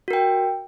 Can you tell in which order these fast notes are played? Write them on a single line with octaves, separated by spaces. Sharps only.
F#4 A#4 G5